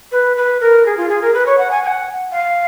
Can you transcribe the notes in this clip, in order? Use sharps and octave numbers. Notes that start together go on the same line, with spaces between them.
B4
B4
A#4
G#4
F4
G#4
A#4
B4
C#5
F#5
G#5
G#5
F#5
F5